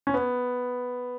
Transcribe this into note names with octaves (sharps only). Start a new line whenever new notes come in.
C#4
B3